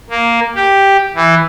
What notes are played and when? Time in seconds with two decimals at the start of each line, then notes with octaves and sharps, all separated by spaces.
0.10 A#3
0.55 G4
1.16 E3